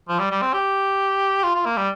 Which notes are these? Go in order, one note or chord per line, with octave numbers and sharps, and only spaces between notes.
F3
G3
G3
C4
G4
F4
F4
A#3
G3